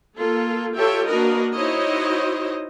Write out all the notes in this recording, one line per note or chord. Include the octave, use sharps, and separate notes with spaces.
A#3 F4 A4
F4 G4 A4 C#5 E5 G5
A#3 D4 F#4 A#4 B4 D#5
D#4 E4 F#4 C5 C#5 D#5